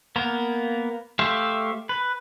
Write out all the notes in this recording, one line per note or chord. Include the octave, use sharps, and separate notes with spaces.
A#3 B3 A#4
A3 G4 C5 E5 F5
B4